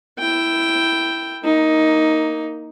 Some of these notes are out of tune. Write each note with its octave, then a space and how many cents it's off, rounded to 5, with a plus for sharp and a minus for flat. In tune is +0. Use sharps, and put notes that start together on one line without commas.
E4 +0 G5 +0
A#3 +0 D#4 +10